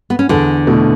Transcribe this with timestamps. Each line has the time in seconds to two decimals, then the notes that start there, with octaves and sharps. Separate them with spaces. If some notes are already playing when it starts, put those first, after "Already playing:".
0.10 B3
0.19 C#4
0.29 E2 D3 D4
0.67 B2 A3 E4